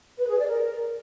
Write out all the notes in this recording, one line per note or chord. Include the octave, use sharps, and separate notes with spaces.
B4
G#4
D5
A#4